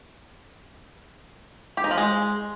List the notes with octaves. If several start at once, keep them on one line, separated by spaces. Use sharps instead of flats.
G4
D#4
F3
G#3